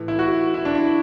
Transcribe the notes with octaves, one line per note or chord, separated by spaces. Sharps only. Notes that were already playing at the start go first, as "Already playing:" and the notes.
Already playing: A2 E3
E4
F#4
E4
D4
E4